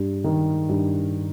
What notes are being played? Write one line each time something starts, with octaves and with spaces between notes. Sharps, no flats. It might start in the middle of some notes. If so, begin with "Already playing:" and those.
Already playing: G2 G3
D#3
G2